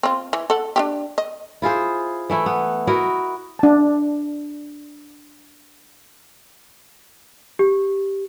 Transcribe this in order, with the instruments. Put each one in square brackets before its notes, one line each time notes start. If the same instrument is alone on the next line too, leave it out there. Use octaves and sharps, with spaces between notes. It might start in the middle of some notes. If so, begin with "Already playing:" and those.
[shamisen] C4 F4
E3
A4 F#5
D4 E4 G4
D#5
[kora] E4 F4 G#4 C5
E3 A3 E4
B3
E4 F#4 A#4 D#5
[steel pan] D4 A5
[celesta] G4